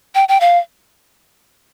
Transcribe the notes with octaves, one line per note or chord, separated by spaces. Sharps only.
G5
G5
F5